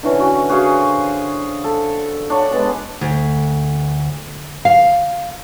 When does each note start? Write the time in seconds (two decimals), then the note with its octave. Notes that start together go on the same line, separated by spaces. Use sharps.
0.03 D3 E3 C#4
0.20 F#4
0.49 F#4 G#4 C5 F5
1.64 A4
2.30 D4 C#5 F#5
2.51 G#3 B3 A5
3.01 D2
4.65 F5